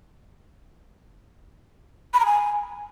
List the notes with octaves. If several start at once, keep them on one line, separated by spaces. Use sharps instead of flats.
B5
A#5
G#5